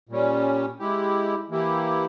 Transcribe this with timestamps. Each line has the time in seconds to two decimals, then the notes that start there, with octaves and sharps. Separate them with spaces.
0.09 A#2 G3 C#4
0.79 G#3 E4 G4
1.50 E3 A#3 E4 G4